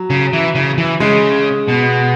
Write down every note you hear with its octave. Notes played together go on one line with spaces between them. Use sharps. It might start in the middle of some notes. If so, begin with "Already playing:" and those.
Already playing: F#3
C#3
E3
C#3
E3
C#3 G#3
B2